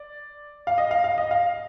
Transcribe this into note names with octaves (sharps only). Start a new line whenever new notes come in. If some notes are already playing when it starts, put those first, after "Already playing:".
Already playing: D5
F5
D#5
F5
F5
D#5
F5